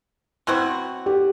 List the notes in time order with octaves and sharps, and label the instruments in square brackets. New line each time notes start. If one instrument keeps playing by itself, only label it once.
[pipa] B2 F#3 C4 F#4 [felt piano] E4
[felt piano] G4